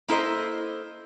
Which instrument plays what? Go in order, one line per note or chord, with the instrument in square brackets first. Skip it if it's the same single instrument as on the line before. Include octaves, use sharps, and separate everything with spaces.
[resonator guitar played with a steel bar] A#3 E4 A4 C5 D#5